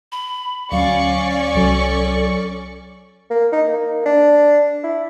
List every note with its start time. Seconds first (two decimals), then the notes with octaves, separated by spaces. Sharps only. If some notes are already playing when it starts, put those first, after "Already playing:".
0.12 B5
0.72 D2 F#3 C#4 D5 F5 C#6
1.55 C2 F#3 A4
3.30 A#3
3.52 D#4
3.68 A#3
4.06 D4
4.84 E4